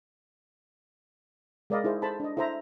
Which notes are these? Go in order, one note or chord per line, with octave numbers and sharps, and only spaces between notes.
G#3 A#4 D5 D#5 F5 B5
D#4 E4 G#4 C5
A4 C5 A5 B5
D4 D#5
E4 A4 C5 E5 A#5